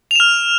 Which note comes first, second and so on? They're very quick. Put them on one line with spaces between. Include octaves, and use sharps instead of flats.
F7 E7 F6